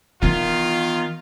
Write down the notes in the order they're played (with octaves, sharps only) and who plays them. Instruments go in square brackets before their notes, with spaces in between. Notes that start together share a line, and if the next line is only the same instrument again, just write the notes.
[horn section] D#3 F4 [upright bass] E3 B3